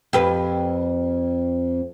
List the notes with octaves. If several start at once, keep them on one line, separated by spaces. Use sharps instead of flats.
F2 G4 B4